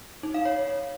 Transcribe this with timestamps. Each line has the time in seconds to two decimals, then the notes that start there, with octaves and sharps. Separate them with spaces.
0.23 D#4
0.34 F5
0.45 C#5